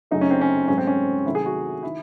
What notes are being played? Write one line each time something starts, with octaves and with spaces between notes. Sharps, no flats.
F#2 C#3 F#3 A3 D#4
C#4
C4
C#4
G#2 F#3 A3 C#4
C4
C#4
C3 D#3 F#3 A3 E4
G#4
F#4
D#3 E4